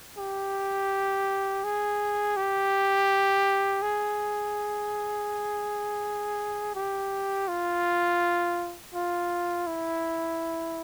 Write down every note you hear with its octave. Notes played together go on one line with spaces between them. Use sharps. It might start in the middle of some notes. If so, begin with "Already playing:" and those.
G4
G#4
G4
G#4
G4
F4
F4
E4